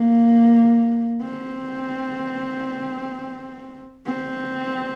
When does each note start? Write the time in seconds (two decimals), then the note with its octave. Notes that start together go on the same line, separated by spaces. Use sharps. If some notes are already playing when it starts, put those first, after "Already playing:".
Already playing: A#3
1.22 C4
4.07 C4